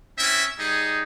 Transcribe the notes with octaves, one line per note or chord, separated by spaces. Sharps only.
C4 C#4 E4 E5
G3 D#4 G#4